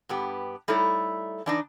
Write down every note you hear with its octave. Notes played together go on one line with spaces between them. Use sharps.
G2 B3 G4
G3 A3 D#4 E4 A4 C#5
E3 D4 D#4